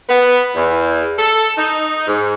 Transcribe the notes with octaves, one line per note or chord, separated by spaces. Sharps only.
B3
E2
A4
D#4
G#2